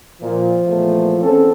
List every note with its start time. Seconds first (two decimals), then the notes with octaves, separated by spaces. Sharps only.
0.21 A#2 F3
0.65 E2 A#2 A3
1.20 E2 C4 C#4 A4